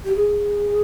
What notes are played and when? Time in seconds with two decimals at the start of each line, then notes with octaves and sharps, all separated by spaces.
0.05 G4
0.15 G#4